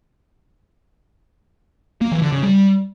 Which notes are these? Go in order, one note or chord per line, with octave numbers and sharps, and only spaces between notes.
A#3
E3
D3
C#3
G3